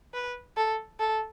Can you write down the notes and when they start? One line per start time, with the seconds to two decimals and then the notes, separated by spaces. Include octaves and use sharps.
0.14 B4
0.57 A4
1.00 A4